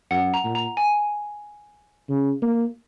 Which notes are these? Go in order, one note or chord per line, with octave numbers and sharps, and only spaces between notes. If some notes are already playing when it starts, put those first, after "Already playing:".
F#2 F#5
A#5
A#2
A#5
G#5
C#3
A#3